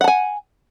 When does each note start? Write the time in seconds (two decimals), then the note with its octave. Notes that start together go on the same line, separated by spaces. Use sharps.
0.01 F#5
0.04 A5
0.08 G#5